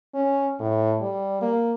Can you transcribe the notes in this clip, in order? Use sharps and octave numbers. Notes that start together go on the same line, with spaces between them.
C#4
A2
G3
A#3